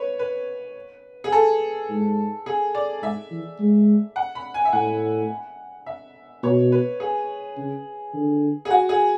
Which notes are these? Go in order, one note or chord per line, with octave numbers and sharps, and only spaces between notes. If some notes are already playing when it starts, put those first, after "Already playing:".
Already playing: B4 C#5
B4
G#4
A4
G#2
G#4
D5
G#2 E5
E3
G#3
F#5
B5
G#5
E5
A2 F#5
E5
B2 C#5
B4
G#4
C#3
D3
G#4
F#4
G#4